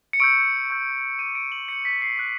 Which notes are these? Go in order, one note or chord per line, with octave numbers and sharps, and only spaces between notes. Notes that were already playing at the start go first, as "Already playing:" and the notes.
C#7
C#6 E6 G6 D7
C#6 E6 G6
D6 G6 D#7
D7
F#7
D6 G6 C#7
B6
C7
D6 F#6